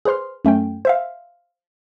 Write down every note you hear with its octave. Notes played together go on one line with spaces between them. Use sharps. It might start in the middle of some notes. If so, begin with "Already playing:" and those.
G#4 B4 C5 C6 F6
F#2 A3 C#4 G5
C5 E5 F5